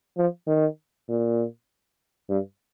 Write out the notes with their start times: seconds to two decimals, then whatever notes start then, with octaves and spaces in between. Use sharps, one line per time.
0.18 F3
0.47 D#3
1.09 A#2
2.29 G2